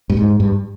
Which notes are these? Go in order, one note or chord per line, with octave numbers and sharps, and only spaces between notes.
G2
G#2
G2